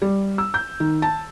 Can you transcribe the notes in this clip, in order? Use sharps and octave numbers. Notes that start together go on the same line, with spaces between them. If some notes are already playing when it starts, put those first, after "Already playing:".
G3
E6
G6
D#3
A5